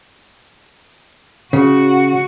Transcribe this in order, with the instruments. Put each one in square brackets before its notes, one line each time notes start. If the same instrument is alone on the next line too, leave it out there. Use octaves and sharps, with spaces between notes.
[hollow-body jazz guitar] C#3 [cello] F#4